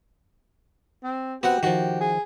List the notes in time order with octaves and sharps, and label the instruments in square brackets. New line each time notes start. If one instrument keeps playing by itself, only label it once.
[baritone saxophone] C4
[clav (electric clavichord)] B3 C4 [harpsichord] F#4 F#5 [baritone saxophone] G4
[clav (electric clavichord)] D#3 F3 [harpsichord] F#4
[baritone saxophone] G#4